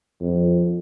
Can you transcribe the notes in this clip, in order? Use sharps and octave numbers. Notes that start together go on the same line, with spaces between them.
F2